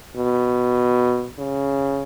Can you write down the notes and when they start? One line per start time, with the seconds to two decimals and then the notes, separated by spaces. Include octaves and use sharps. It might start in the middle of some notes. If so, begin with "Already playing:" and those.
0.16 B2
1.39 C#3